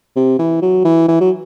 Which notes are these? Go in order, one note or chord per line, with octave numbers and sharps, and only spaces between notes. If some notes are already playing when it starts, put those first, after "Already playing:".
C3
E3
F#3
E3
E3
F#3